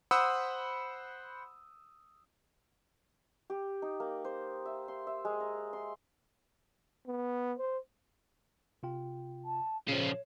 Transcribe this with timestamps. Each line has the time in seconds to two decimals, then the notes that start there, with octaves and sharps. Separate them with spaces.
0.11 C5 F#5 B5 D#6 E6
3.50 G4
3.82 D#4
4.00 A#3
4.25 C5
4.65 E5
4.88 C6
5.07 E5
5.25 G#3
5.40 A#5
5.73 C6
7.07 B3
7.58 C5
8.83 C3 F4 G5
9.45 A5
9.89 A#2 C#3 F3 C#5